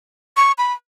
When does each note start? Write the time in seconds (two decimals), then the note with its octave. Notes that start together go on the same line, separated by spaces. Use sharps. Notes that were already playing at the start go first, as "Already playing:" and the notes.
0.37 C#6
0.58 B5